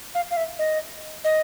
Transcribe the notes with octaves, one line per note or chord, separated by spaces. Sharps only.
F5
F5
E5
D#5
D#5